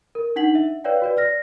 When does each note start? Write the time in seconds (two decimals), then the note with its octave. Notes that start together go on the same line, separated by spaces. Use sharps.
0.15 A#4
0.36 D4 D#4 F#5 B6 F#7
0.55 E5
0.84 B4 C#5 D5 F5 G5
1.02 F#4 B4 D5
1.17 D5 F6 A#6